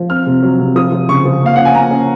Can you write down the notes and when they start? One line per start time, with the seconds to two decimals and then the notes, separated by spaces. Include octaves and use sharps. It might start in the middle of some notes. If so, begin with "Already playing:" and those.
Already playing: F3
0.10 C4 F6
0.26 C3
0.42 F#3
0.59 C3
0.76 F3 D#6
0.92 F3
1.09 C#3 C#6
1.25 F3
1.42 A#3 F5
1.56 C#4 F#5
1.65 G#5
1.75 A#3 A#5
1.91 C#4